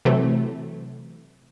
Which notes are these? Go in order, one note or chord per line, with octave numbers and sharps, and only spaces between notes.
C3 E3 F#3 A3